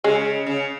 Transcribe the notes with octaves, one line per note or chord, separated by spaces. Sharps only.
C#3 G#3
C#3